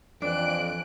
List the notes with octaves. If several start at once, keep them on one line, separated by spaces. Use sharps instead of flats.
F2 E3 D4 F#6 D7